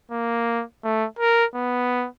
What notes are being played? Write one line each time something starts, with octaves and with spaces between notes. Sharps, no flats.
A#3
A3
A#4
B3